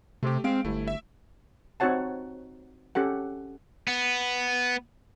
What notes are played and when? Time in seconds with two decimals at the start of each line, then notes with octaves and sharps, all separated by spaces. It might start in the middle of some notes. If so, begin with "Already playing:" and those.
0.23 C3 A3 G4
0.44 G#3 C4 F5 D7
0.65 G1 A3 E4
0.88 E5
1.80 C4 D#4 F#4 C#5 F#5 A5
2.95 C#4 G4 A4 F#5
3.88 B3